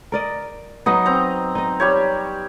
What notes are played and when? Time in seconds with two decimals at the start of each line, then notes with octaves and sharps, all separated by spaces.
0.12 A#4 D5 D#5
0.86 F#3 B3 D#4 D#5
1.06 C4 A#5
1.55 D#4 D#5
1.80 G3 G4 C#5